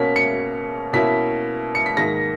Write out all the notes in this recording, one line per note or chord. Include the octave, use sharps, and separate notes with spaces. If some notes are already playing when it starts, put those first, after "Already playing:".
Already playing: B2 A#3 C#4 B6
C#7
B2 A#3 C#4 E4 B6
C#7
B6
G#2 D#3 A#3 A#6